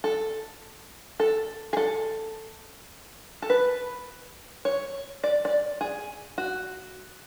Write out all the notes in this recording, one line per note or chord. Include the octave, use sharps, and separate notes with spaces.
A4
A4
G#4
A4
A4
B4
C#5
D5
D5
G#4
F#4